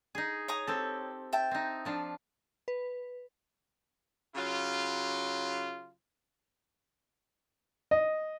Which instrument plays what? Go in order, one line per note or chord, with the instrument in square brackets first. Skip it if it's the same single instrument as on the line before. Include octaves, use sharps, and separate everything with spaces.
[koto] D#4 G#4
[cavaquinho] C#5 A#5 D#6
[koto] C4 G4 A4
[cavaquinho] E5 G5 A5
[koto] C4 D#4
F3 D4 F4
[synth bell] B4
[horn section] C#3 F#3 F4
[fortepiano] D#5